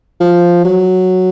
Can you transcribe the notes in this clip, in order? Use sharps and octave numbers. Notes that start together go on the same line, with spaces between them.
F3
F#3